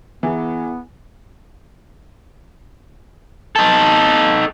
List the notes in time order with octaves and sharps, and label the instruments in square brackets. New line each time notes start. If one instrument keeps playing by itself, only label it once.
[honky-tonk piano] E3 [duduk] B3 [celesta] E4 G#4 E5
[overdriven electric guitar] D#4 A4